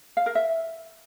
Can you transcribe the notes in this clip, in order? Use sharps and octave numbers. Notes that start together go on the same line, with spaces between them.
F5
A#4
E5